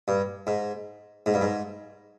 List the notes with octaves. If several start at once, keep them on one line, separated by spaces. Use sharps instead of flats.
G2
G#2
G#2
G2
G#2